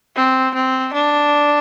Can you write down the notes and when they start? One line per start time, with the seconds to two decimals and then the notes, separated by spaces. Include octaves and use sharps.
0.16 C4
0.54 C4
0.94 D4